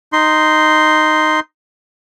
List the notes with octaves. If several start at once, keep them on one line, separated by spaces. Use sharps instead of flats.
D#4 C6